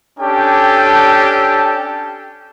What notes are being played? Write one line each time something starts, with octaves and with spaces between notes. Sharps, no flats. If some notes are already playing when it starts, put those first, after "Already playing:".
C#4 D4 G4 A4 G5